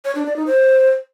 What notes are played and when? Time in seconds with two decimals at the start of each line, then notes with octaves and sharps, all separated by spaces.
0.05 C#5
0.15 D4
0.26 D5
0.36 D#4
0.47 C5